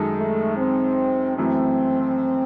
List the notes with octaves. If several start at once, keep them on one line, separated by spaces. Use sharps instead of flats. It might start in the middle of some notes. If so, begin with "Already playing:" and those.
Already playing: F#2 D#3 G#3 D#4 A4
A3
C4
F#2 E3 A3 C4